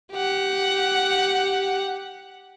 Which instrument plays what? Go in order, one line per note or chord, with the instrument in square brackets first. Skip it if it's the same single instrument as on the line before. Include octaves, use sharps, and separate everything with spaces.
[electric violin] G4 F#5